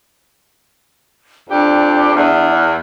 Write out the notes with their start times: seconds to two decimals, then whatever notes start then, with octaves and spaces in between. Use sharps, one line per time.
1.50 F2 D4 G4 D5
2.15 E2